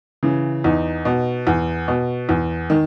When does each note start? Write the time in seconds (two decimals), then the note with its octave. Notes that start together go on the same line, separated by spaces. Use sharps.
0.23 C#3 E3
0.64 E2 D#4
1.05 B2
1.47 E2
1.88 B2
2.29 E2
2.70 D#3